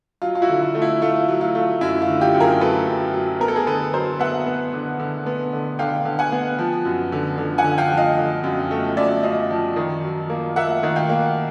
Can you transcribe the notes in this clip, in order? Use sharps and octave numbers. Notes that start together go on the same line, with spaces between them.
F#3 F4
F4
E4 F#4
D3
F4
A3
E4
A3 F4
F#3
F4
A3
F#2 E4
F4
D3
F4 G4
F#2
G#4 A#4
F#3 A4 B4
F#2
F#3
B3 A#4
A4
G#4 A#4
D3 A4 B4
F#3 A#4 C5
B3 E5 F#5
B3
D3
D3
B3
D3
D3 F5 G5
D3
F#5 G#5
B3
F3
F#2
D3
D3
F#5 G#5
D3
F5 G5
F3
D#5 F5
D3
F#2
A3
F#2 D5 E5
F#2 D#5 F5
F3
D#3
F#3
A#3
A#3 E5 F#5
D#3
F5 G5
A#3